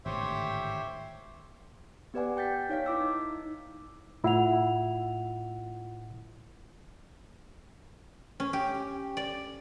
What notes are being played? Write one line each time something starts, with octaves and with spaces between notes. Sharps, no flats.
G#1 A2 D3 G4 C5 C#5 E5
B3 G4 B4 D5 F#5 G#5
G5 G6 A6 B6
D#4 C#5 F5 B6
E4 D6 E6
D#4
A2 E4 F4 F#5 F7
C#4
G4
D5